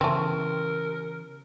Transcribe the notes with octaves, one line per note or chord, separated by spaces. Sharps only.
C#3 E3 A3 B3 C4 A#4